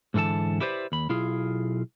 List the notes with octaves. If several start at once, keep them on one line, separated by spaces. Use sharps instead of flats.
G#2 D3 E3 A4 A5
E4 G4 B4 C5 D5
D#2 B5
B1 E4 F4 G#4